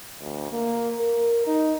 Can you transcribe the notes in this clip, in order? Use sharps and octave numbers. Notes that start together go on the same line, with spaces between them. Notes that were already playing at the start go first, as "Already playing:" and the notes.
D2
A#3
A#4
D#4